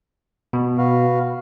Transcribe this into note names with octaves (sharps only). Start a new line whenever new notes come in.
B2
F#4 B4 F5